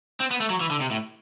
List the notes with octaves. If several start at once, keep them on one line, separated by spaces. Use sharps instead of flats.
C4
B3
A3
F#3
E3
D3
C3
A2